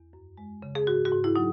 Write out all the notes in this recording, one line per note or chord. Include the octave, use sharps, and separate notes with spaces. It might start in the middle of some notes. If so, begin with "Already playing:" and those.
Already playing: E2
F#2
G#3
C#3
G#4
G#2 F#4
F#4
G#2
E4
F#3 D#4